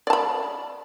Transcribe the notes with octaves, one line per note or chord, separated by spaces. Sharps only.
D5 A5 B5